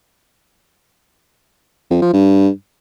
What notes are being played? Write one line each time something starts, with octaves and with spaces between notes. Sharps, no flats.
F2
F3
G2